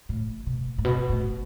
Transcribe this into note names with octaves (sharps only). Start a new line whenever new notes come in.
A2
B2
A2
B2
A2